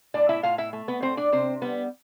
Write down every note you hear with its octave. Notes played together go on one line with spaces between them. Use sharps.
A2 D4 D5
E4 E5
A2 F4 F5
E4 E5
A3
B3 B4
A2 C4 C5
D4 D5
C3 C4 C5
G3 B3 B4